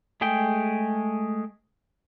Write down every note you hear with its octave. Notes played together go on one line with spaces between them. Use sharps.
G#3 A3 G#4 G5